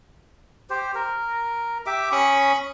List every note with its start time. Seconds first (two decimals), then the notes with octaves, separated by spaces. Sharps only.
0.70 G4 C5
0.95 A#4
1.86 G4 E5 D6
2.12 C#4 B5 C#6 D#6